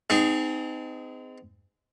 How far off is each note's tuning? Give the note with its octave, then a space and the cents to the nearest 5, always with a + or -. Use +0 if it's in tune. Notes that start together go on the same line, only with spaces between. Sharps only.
C4 -35 D#4 +0 G#4 +0